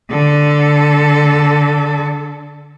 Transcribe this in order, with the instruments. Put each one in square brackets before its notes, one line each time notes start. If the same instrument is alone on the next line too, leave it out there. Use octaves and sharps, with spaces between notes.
[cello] D3 A4